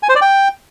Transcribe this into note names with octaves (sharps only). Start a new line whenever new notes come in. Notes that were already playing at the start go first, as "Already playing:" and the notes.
G#5
C5
D5
G5